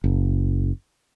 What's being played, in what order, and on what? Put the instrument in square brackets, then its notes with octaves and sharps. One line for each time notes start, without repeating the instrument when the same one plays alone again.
[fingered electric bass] F#1